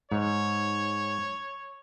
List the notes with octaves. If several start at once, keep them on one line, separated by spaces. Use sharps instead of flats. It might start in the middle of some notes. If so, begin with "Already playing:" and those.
G#2 C#5